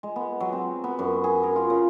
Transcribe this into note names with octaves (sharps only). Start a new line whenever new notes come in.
G#3
B3
F#3
C4
B3
F#2
G#4
A#4
F4
C#3